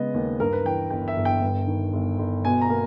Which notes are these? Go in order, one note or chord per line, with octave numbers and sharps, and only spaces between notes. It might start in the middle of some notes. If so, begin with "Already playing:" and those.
Already playing: C#3 G#3 B3 D#5
D#2
G2 A#4
B4
E3 G5
G1 G5
E5
G1
G5
G2
D#3
G1
G1
B2 G#5
A#5
A#3